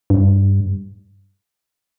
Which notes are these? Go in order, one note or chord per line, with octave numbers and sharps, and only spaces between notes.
G2